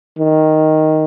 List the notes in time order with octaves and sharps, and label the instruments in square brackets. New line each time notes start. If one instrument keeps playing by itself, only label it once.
[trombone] D#3